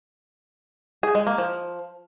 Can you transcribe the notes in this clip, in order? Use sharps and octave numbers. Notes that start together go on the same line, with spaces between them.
G#4
G#3
A#3
F3